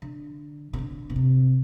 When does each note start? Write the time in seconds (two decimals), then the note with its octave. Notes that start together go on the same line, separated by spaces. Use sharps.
0.02 D3
0.73 C3
0.78 D3
1.10 B2
1.16 C3